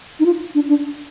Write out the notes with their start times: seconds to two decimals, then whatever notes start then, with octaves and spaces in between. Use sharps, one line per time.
0.20 D#4
0.26 F4
0.55 D4
0.68 D4